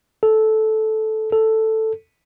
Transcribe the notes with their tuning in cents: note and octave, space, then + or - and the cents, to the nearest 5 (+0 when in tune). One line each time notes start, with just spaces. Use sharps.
A4 -10
A4 +5